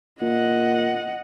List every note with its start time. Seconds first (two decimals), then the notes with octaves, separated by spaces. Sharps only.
0.22 A#2 D#5 F#5